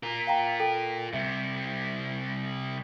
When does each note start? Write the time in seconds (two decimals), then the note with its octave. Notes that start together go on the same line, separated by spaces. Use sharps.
0.03 F4 A#4
0.27 F5 G5 A#5
0.60 A4 G5
1.14 C3 G3 E5